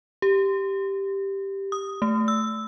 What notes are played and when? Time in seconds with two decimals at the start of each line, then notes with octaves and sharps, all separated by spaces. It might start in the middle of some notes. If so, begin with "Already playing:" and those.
0.22 G4
1.72 D#6
2.02 A3
2.28 E6